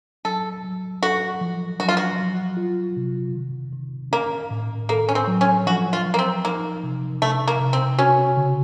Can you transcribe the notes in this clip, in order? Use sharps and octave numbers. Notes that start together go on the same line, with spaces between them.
F#3 A4
F#3
F#4 A4
F3
F#3 F#4
F4
F#4
F#3
F4
C3
D#3
D#3
A#3 C#4
A2
A#3 A4
C#4
C4
F#3
C#4
F3 F#4
F4
F3
A#3
C4
A#3 D#4
C3
C3 A3
A#3
C3
C4
C#4 F#4
C#3